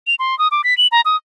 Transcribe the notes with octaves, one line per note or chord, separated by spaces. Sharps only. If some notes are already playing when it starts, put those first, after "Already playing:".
F7
C6
D#6
D6
B6
F#7
A#5
D#6